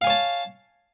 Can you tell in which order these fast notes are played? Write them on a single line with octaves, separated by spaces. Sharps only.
F5 G#5 C#5 A5